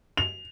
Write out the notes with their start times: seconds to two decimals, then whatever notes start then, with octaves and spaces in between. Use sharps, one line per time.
0.17 F7